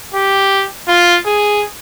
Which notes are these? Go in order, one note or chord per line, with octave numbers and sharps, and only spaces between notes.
G4
F4
G#4